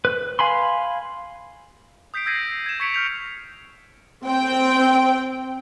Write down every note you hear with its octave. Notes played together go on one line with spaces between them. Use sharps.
B4
F5 G#5 B5 C6
D#6 G6 B6 C7 D7
E6 G6 G#6 A#6 C7 D#7
G#6 E7
C#6 G#6 B6 C#7 D7 F7
F6 G6 F7
C4 G5